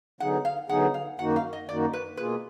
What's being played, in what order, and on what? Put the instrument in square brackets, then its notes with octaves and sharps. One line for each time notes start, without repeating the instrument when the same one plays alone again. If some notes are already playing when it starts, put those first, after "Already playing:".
[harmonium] D3 F#3 B3 D#4 G#4 [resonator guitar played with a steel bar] F#5
[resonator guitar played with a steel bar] F5
[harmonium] D3 F#3 B3 D#4 G#4 [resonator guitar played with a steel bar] F#5
[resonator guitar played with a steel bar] F5
[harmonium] F#2 D#3 A#3 D#4 F#4 [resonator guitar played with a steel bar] F#5
[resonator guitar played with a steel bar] F5
D#5
[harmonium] F#2 D#3 A#3 D#4 F#4 [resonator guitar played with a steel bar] D5
[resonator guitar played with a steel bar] B4
[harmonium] B2 A#3 F4 G#4 [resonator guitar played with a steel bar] B4